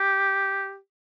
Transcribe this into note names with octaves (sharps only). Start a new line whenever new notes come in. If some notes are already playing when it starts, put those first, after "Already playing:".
Already playing: G4